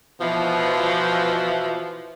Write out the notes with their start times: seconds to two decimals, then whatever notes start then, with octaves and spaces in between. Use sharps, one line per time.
0.21 B2 E3 F3